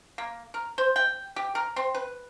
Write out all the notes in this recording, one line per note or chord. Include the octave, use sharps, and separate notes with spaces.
A#3
A#4
C5
G5
G4
A#4
C4
B4